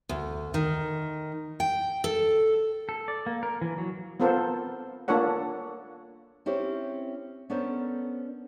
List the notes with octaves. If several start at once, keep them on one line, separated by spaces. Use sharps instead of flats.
D2
D#3
G5
A4
A4
D5
A#3
A#4
E3
F#3
B3 C4 F4 A4 A#4 C5
A#3 D4 F4 A4 C#5 F#5
C4 C#4 E4 G4 C5
B3 C#4 D4 A4 A#4 C5